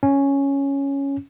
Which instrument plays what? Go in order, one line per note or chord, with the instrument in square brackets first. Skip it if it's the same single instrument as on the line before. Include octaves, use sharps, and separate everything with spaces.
[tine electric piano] C#4